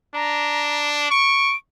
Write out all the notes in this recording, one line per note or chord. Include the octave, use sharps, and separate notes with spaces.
D4 A#5
C#6 D7